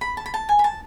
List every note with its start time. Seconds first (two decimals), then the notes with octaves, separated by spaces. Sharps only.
0.01 B5
0.17 A5
0.26 B5
0.34 A5
0.49 G#5
0.59 B5
0.64 A5